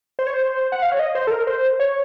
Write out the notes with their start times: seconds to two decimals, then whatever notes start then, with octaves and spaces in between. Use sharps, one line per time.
0.19 C5
0.27 C#5
0.34 C5
0.72 F#5
0.82 F5
0.92 C#5
0.99 D#5
1.15 C5
1.27 A4
1.31 A#4
1.47 C5
1.80 C#5